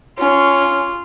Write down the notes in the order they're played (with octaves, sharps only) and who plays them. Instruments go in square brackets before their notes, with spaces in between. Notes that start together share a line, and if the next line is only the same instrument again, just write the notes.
[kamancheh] C#4 [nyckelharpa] F4